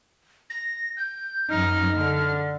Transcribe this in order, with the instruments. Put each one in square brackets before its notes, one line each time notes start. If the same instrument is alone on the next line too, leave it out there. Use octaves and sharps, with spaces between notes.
[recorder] A#6
G6
[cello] F#2 D#4 [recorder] F6
[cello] D3